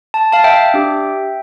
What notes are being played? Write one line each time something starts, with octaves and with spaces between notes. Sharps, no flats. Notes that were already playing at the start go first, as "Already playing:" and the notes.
A5
F5 A5
E5 G5
D4 G4